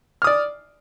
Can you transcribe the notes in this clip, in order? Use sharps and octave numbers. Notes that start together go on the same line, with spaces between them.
D5 D#6 F6